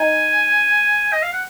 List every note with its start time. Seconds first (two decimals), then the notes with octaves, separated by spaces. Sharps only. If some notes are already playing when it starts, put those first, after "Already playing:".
Already playing: D#4 G#5
1.13 D#5
1.23 F5
1.33 F#5